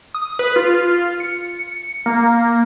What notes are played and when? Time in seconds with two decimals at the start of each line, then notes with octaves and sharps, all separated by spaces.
0.14 D#6
0.39 B4
0.56 F4
1.20 C#7
2.06 A#3